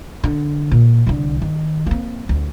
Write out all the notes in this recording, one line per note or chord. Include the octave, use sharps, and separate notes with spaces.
D3
A#2
C2 D3
D#3
A#3 C4
D2